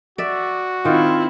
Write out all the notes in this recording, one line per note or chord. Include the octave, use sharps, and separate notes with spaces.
F#4 D5 E5
D#3 C4 E4 F4